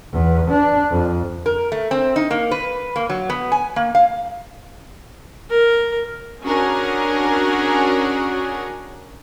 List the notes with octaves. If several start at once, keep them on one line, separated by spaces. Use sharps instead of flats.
E2
D4
F2
A#4
A3
C4
D#4
A#3
B4
A#3
F#3
B3
G#5
A#3
F5
A#4
C#4 D4 F#4 G#4 A#4